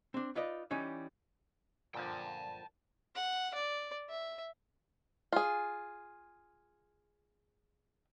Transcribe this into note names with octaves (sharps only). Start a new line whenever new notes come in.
C4 D4
D#4 F4 B4 D5 D#5
E3 G3 C#4 D#4
A#2 D3 F3 G5 A5
F#5
D5
E5
F4 G#4